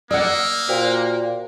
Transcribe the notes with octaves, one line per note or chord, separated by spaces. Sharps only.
A#3 D5 F#5 D#6 E6 F#6
A#2 F#4 C5 G5